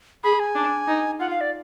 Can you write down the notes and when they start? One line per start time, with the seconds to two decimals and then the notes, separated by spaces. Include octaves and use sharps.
0.23 G#4 B5
0.40 G#5
0.55 D4
0.87 D#4
1.20 F4 F#5
1.30 F5
1.41 D5